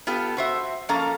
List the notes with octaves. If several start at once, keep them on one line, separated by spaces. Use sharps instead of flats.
B3 F4 G4 A4
F#4 C5 E5
F3 A#3 C#4 A4 F5 A#5